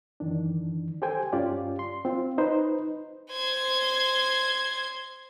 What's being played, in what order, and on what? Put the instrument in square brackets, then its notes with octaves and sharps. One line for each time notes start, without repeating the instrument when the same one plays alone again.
[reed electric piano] F#2 D#3 E3 D4
G4 A4 C5 G5 G#5
G2 C#4 F4 G4 D5
C6
C4 F4
D#4 B4 C5
[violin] C5 G#6